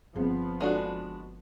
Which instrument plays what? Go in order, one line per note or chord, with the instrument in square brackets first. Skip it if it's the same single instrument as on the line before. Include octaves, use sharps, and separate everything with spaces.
[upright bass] G1 [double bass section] F3 B3 [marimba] G3 C4 G#4
[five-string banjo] G#3 D4 F#4 [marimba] F4 A4